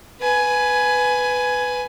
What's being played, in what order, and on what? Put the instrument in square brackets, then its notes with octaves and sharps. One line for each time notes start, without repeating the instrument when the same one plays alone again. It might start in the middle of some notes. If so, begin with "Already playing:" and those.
[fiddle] B4 G#5